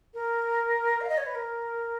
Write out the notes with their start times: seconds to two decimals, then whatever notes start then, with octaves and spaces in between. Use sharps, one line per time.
0.13 A#4
1.00 F5
1.08 D#5
1.17 C#5
1.26 B4
1.34 A#4